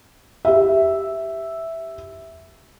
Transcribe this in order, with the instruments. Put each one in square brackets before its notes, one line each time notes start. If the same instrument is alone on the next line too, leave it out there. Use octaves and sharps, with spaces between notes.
[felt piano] G4 E5